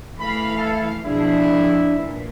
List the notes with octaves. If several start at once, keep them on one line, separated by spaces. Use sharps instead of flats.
E3 A3 F5 B5
E4 A4
B2 F3 D4 E4 G#4
F2
A#2 E3 D4 B4